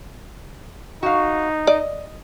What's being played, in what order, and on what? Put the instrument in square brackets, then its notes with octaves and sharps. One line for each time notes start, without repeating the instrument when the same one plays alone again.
[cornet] D#4 [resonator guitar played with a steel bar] F#4 F5
[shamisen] D5 [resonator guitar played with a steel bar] D#5